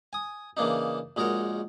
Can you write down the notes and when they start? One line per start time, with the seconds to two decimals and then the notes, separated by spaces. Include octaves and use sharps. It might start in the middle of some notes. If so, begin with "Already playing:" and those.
0.13 G#5 D#6
0.57 C#3 E3 A#3 D4 D#4
1.16 A#1 G#3 D#4 F#4 A#4 C#5